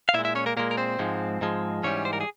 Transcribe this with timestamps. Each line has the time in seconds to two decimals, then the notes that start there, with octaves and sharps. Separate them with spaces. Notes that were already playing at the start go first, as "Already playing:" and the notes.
0.09 F5
0.14 A#2 E4 E5
0.19 G#3
0.25 E4 E5
0.35 C#4 C#5
0.46 A#3 A#4
0.57 A#2 G#3 A#3 A#4
0.71 A#4
0.77 C4 C5
0.99 G#2 F3 G#3
1.41 G#2 F3 G#3
1.83 G#2 E3 G3 C#4 C#5
2.05 C5
2.13 A#4
2.21 G#4